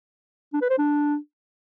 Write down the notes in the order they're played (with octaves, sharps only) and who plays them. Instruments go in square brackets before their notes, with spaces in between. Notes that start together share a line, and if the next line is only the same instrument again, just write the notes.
[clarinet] D4
B4
C5
D4